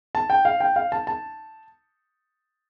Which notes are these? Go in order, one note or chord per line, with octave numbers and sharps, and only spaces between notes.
A5
G5
F5
G5
F5
A5
A5